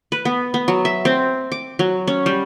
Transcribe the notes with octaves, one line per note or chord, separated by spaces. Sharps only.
B4
B3
B3
F#3
E5
C4
D6
F#3
C#4
G3